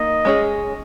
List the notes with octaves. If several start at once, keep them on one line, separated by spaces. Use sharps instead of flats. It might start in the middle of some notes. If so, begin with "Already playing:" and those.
Already playing: A#3 D#4 D#5
G#3 C#4 G#4